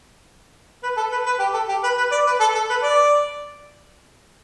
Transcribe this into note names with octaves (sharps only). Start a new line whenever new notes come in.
B4
A4
B4
B4
G4
A4
G4
B4
B4
D5
B4
A4
A4
B4
D5